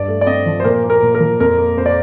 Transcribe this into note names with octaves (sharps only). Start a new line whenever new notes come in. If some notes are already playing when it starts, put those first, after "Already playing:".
Already playing: G2 D5
A3
D5
C4 D#5
F3
C5
A#2 A#4
A#3
A#4
A#2
A#4
F3
F2 A#4
A#3
F2 C5
D5